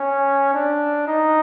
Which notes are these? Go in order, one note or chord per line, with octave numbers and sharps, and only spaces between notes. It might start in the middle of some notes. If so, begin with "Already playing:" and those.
Already playing: C#4
D4
D#4